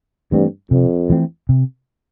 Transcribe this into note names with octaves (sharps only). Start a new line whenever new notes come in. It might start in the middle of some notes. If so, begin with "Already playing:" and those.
G2 E3 A3 C4
F2 C3
E3 A3 C4
C3